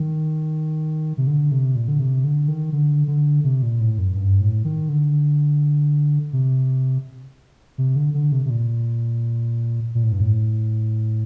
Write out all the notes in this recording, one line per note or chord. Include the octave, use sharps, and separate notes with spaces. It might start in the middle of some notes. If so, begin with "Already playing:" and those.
Already playing: D#3
C3
D3
C3
A#2
D3
C3
D3
D#3
D3
D3
C3
A#2
A2
F#2
G2
A2
D#3
D3
C3
C3
D3
D3
C3
C3
A#2
A#2
A2
G2
A2